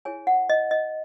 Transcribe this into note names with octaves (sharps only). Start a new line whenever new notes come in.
E4 G#4 C#5 G#5
F#5
D#5
D#5